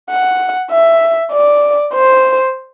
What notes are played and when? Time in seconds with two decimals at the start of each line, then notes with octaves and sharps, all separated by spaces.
0.10 F#5
0.71 E5
1.32 D5
1.94 C5